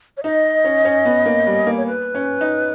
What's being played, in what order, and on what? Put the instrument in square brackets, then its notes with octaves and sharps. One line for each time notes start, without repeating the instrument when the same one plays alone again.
[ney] C#5
[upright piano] D#4 [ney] D#5
[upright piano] C#4
C#4
B3
A#3
G3
A#3
[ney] C#5
B4
[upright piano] C#4
D#4